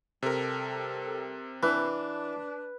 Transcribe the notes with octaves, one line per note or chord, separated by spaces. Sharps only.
C3 G3 A4 A#4
E3 D4 B4